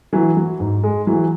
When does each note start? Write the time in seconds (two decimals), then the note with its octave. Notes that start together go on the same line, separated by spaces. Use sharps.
0.13 E3 F#3
0.37 F#3
0.60 G#2
0.84 G#3
1.07 E3 F#3